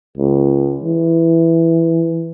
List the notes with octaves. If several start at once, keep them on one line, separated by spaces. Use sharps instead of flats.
C#2
E3